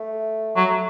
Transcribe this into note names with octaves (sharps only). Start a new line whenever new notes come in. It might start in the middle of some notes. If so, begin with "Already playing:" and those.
Already playing: A3
F#3 A3